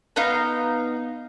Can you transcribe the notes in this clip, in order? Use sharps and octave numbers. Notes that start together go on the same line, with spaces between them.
B3 D#4 F5